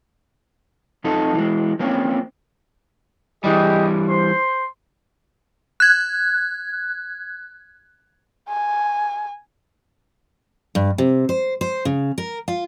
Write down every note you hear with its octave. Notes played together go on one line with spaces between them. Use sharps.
F2 F3 D#4 A4
E3 G#3
F3 A#3 C4 C#4
E3 G3 G4 G#4 D#5
C5 C6
F#6 G#6
G#5
G2
C3
C5
C5
C#3
A#4
F4